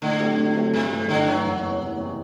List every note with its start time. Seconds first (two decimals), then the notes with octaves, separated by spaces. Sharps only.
0.02 A2 D3
0.20 F#3 A3 C4 G4
0.38 A2
0.55 F#3 A3 C4 G4
0.73 G1 C3
0.91 G2 E3 A3
1.09 G1 D3
1.27 G2 E3 F#3 A3
1.44 F#1
1.62 E2 C3
1.80 F#1
1.98 E2 C3